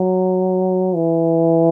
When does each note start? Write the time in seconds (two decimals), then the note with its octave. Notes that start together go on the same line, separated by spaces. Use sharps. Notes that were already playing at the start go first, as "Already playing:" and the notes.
Already playing: F#3
0.96 E3